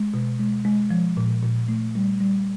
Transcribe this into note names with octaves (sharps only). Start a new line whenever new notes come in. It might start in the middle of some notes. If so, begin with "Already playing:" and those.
Already playing: G#3
B2
G#3
G#3
F3
A#2
A#2
A3
G3
G3